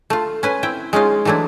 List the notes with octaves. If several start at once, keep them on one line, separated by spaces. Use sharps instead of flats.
A3 F4
C#4 B4 G#5
C4 E4 G5
G#3 C#4 D#4 F4
E3 F#3 A3 D4 E4